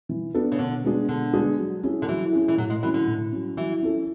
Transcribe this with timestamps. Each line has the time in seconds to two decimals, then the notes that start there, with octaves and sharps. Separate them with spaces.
0.09 E3
0.34 B3 D4 A4
0.52 C#3
0.59 B2 D3
0.84 G#3 B3 D4 G#4
1.08 B2 D3
1.33 G#3 B3 D4 G#4
1.58 F#3
1.83 C#4 E4 G#4
2.02 D3
2.08 E3 F#3
2.33 C#4 E4 G#4
2.48 E3
2.57 A2 F#3
2.70 G#3
2.83 E3 F#3
2.86 C#4
2.94 D3
3.07 A2
3.32 F#3 C#4
3.57 E3 F#3
3.82 C#4 E4 A4